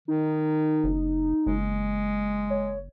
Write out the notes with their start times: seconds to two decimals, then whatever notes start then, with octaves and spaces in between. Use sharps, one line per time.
0.08 D#3 D#4
0.84 F#1
1.46 F#1 G#3
2.50 C#5